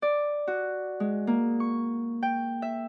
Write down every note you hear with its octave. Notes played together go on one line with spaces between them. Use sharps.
D5
F#4
G#3
A#3
C#6
G5
E5